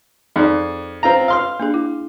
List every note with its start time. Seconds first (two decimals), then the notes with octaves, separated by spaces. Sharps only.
0.36 F2 D#4 G#4 D5
1.03 C4 F4 A#5
1.28 F5 C6 F6
1.60 A#3 D4 G#4
1.74 E4